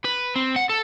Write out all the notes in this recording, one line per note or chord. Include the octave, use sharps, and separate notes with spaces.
B4
C4
F#5
A4